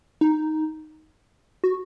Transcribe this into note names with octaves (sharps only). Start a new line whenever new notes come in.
D#4
F#4